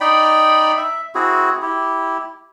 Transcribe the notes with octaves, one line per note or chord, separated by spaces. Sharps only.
D#4 D5 G5 B5
E5
C4 E4 F#4 G#4
E4 G4